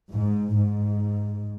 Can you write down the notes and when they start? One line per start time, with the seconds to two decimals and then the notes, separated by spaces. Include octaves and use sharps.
0.12 G#2
0.56 G#2